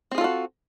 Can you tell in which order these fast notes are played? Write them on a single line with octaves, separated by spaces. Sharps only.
C4 G#4 F4 A4 F#4